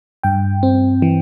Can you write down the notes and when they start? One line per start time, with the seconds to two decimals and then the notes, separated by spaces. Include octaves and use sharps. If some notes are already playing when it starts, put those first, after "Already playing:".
0.23 G2 G5
0.63 C4
1.02 E3